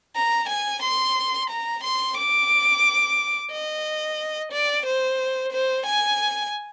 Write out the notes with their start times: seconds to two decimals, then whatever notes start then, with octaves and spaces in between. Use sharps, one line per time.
0.16 A#5
0.49 G#5
0.83 C6
1.50 A#5
1.84 C6
2.17 D6
3.52 D#5
4.52 D5
4.86 C5
5.53 C5
5.86 G#5